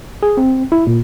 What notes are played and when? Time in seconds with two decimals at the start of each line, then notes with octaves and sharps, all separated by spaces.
0.23 G#4
0.37 C4
0.72 E4
0.87 A#2